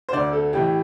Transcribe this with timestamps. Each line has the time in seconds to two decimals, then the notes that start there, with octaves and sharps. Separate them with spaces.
0.09 C5
0.13 D2 D3 D5
0.33 A4
0.53 A1 A2 E3 G4